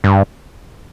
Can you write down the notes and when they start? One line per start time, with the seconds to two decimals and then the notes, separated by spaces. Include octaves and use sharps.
0.04 G2